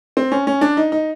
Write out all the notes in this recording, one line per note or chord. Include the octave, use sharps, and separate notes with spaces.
C4
C#4
C#4
D4
D#4
D#4